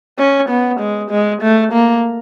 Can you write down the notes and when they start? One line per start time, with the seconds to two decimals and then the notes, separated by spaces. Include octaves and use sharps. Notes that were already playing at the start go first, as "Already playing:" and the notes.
0.18 C#4
0.49 B3
0.80 G#3
1.11 G#3
1.42 A3
1.73 A#3